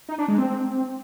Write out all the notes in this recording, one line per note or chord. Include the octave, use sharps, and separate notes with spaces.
D#4
D4
G#3
C4